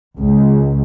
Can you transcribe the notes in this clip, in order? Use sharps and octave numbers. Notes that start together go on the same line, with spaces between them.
C#2